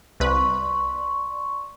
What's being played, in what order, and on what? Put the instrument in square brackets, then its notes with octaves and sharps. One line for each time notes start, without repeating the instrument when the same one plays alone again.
[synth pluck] C2 B4 [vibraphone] D5 C6 C#6